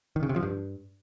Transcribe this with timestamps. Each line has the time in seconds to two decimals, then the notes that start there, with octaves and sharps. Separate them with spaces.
0.16 D#3
0.23 C#3
0.29 C3
0.36 F3
0.43 G2